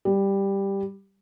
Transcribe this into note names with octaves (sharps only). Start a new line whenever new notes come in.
G3